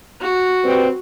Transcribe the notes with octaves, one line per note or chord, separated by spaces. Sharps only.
F#4
G3 C4 B4